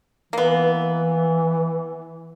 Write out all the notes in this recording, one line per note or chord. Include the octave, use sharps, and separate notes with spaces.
E3 A#3 B3